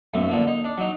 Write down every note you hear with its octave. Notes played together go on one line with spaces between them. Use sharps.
B1 F#2 A3
D3 F3 A#3
D#4
D4
F#3 D#4